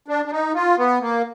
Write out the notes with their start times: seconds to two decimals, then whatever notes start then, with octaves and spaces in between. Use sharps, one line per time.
0.08 D4
0.25 D4
0.32 D#4
0.55 F4
0.78 B3
1.01 A#3